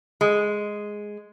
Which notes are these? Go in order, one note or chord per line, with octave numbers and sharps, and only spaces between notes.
G#3